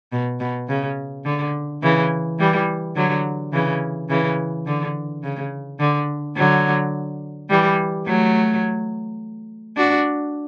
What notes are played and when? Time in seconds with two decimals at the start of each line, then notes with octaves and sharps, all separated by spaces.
0.13 B2
0.40 B2
0.68 C#3
1.25 D3
1.83 C#3 E3
2.39 E3 G3
2.96 D3 F#3
3.53 C#3 E3
4.09 C#3 E3
4.66 D3
5.23 C#3
5.80 D3
6.36 D3 F#3
7.50 E3 G3
8.06 F#3 A3
9.77 D4 F#4